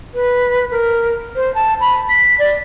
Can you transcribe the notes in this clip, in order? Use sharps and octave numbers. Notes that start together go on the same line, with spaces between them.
B4
A#4
C5
A5
B5
B6
D5